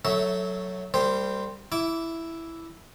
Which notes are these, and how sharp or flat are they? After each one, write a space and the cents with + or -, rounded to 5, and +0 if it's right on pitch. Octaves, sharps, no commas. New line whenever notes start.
F#3 +0 A3 +5 E5 -20
G3 +0 A#3 -40 C5 +0
E4 +0 D6 -20